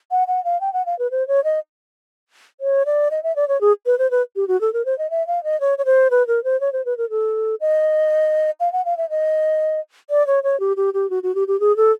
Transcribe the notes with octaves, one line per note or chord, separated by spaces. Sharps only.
F#5
F#5
F5
G5
F#5
F5
B4
C5
C#5
D#5
C#5
D5
D#5
E5
D5
C#5
G#4
B4
C5
B4
G4
F#4
A4
A#4
C5
D#5
E5
F5
D#5
C#5
C#5
C5
B4
A#4
C5
C#5
C5
B4
A#4
A4
D#5
F5
F#5
F5
E5
D#5
D5
C#5
C#5
G4
G4
G4
F#4
F#4
G4
G4
G#4
A4